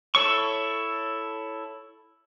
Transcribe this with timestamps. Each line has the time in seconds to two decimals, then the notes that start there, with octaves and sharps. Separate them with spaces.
0.15 E4 A4 C#5 C#6